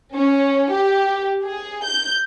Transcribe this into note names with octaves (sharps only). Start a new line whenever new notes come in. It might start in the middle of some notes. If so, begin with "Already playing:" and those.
C#4
G4
G#4
G6